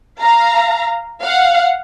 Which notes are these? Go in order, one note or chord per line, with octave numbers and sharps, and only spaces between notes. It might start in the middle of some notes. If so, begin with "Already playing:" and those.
F5 A#5
F5 F#5